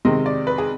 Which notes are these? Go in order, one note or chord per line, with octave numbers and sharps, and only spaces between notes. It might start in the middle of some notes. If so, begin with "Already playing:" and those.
C3 D#3 G#3 C4 D#5
D5
B4
G#4